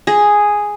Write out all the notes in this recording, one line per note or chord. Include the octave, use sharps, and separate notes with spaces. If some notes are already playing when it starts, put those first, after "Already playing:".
G#4